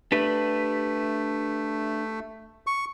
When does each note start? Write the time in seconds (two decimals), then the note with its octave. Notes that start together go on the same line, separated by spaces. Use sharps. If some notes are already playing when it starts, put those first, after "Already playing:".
0.12 A3 D4 G4 B4
2.67 C#6